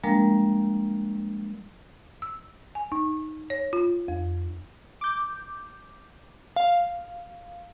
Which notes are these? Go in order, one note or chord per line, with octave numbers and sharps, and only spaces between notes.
F3 G3 G#3 A#3 D4 A#4
E6
G#5
D#4
C#5
F4
F2
D6 G6
F5